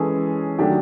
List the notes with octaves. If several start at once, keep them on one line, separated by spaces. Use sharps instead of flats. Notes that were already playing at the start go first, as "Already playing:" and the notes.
Already playing: E3 G#3 C#4 G#4 A4
D#3 F#3 A3 D4 G4